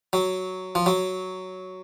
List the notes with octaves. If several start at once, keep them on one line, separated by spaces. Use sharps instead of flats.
F#3
F3
F#3